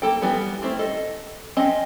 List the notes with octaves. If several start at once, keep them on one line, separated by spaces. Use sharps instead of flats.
A#3 A4 G5
E3 G3 B3
G3 A3 C4 E4
A4 D#5
C4 C#4 D#5